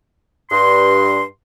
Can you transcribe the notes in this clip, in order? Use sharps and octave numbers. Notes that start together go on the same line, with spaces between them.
G2 C6